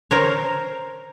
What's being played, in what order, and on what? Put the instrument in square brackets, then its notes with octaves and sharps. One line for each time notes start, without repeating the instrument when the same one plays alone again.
[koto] A#4 C5 C#5